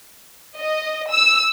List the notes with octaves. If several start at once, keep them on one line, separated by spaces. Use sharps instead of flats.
D#5
E6